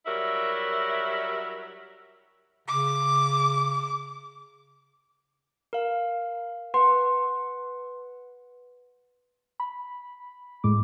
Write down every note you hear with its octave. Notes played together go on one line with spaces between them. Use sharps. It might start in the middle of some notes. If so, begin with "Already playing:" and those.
F#3 G3 E4 A#4 E5
C#3 D6
A#4 F5
B4 F#5 C6
B5
A2 G#3 D6